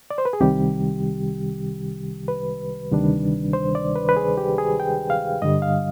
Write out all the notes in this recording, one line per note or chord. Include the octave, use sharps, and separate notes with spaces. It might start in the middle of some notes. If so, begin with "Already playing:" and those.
D5
C5
B4
G#4
C2 C3 D#3 G3 G4
B4
D2 C3 D#3 G3 D4
C5
D5
B4
B4
G#4
G4
G#4
G5
F5
G2 D3 G3 D#5
F5